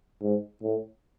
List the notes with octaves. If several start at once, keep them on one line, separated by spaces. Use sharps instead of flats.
G#2
A2